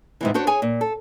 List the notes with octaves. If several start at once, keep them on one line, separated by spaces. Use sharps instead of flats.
G#2 C3 E3
D4 F#4 C5 C#5
G#4 C#5 G#5
A#2
A4